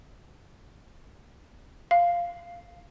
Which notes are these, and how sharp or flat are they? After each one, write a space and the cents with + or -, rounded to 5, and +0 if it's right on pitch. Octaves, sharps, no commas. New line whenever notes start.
F5 -5